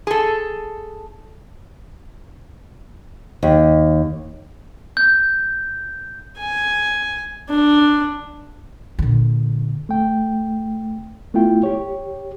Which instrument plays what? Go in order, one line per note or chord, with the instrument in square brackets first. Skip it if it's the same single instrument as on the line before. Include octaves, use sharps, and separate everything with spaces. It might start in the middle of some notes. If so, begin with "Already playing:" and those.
[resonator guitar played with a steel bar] G#4 A4
[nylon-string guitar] D#2
[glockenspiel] G6
[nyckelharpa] G#5
D4
[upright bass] A#2 D3
[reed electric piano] A3 G5
A3 B3 E4 F4 G5
G4 C#5